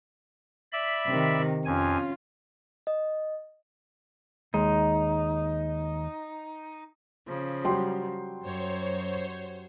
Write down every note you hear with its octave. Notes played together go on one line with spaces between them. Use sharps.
D5 E5 B5
C3 D#3
F2 C#4 F4 G#5
D#5
D#2 G#3 D#4
C#3 F3
F#3 G3 G5 C6
F#2 C5 C#5